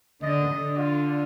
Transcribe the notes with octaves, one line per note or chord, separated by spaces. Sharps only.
D3 D#5
D3
F4